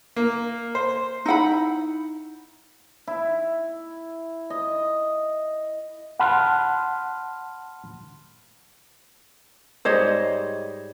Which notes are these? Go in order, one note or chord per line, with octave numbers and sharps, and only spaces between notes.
A#3
C5
D#4 E4 F#5 B5
E4
D#5
F#5 A5 B5 C6 F6 F#6
G#2 G3 C5 C#5 D#5